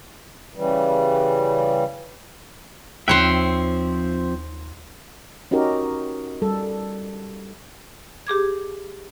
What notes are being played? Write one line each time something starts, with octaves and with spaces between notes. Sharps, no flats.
C#3 E3 G3
D#2 F3 C4 C5 C#5 E5 G5
C#4 D#4 F#4 G4 A#4
G3 A4
G4 G#4 D6 G#6